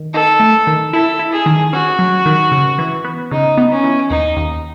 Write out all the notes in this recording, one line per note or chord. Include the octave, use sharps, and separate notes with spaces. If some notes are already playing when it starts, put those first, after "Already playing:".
Already playing: D#3
D#4 A4
A3
D#3
E4 A4
E4
G#4
D#3
C#4 F#4
F#3
D#3
C#3
E3
B3
C#3 D#4
B3
C#4
E3
D#2 D#4
D#2